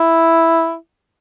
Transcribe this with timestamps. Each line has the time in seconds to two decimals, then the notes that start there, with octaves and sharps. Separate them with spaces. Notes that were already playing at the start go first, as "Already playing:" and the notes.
Already playing: E4